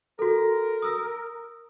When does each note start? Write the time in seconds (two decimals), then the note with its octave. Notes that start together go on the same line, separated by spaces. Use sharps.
0.19 F#4 A4 A#4
0.82 D#6 E6